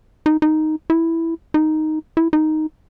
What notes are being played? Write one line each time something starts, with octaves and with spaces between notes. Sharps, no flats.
D#4
D#4
E4
D#4
E4
D#4